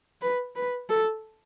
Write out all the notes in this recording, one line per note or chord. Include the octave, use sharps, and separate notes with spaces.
B4
B4
A4